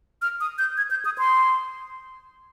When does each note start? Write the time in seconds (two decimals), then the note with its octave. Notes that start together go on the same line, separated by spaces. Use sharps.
0.22 F6
0.40 D#6
0.58 G6
0.77 G#6
0.91 G6
1.05 D#6
1.18 C6